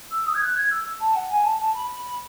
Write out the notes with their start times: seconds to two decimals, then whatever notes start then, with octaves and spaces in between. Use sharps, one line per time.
0.11 E6
0.26 D#6
0.34 G#6
0.41 F#6
0.55 G#6
0.71 E6
1.00 A5
1.14 F#5
1.29 G#5
1.44 A5
1.59 A5
1.74 B5